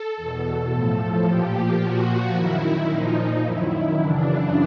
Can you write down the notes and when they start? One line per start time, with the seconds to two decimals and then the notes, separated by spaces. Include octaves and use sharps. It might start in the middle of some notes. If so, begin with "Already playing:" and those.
Already playing: A4
0.17 E2 B2
0.71 A2 F3 A4
1.26 A#2 F3 G4
1.80 A#2 F3 F#4
2.35 F#2 D#3 E4
2.90 A#2 F3 D#4
3.44 F#2 D#3 E4
3.98 F#2 C#3 E3 D4